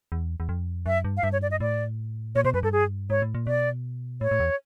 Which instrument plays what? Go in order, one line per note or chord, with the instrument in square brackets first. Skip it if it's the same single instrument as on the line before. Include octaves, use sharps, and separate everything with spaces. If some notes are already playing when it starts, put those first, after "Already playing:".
[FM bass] E2
E2
F2
[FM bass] F#2 [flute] E5
[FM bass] G2
[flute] F5
[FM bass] G2 [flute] E5
[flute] C#5
D5
D#5
[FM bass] A2 [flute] D5
[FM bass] A#2 [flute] C#5
[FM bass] B2 [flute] C5
[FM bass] F#2 [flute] B4
[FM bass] G2 [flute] A4
[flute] G#4
[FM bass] G#2 [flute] C#5
[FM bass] A2
A#2
[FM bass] B2 [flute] D5
[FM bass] A2 [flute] C#5
[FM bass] A2
E2